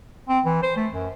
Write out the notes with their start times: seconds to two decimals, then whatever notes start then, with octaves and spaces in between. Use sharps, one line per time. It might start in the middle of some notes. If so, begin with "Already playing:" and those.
0.29 C4
0.45 E3
0.63 C5
0.76 A3
0.92 F#2